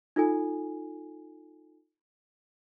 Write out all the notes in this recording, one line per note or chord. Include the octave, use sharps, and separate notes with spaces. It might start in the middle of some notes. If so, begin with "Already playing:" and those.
D#4 F4 A4 G#5